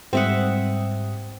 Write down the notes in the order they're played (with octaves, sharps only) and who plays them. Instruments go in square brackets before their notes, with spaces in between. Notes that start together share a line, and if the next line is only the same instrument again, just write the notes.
[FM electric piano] G#2 G3 D#6 [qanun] C4 E5 F#5